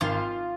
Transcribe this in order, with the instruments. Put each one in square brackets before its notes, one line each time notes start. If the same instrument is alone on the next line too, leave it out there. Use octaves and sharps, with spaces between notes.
[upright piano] G#1 [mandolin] F4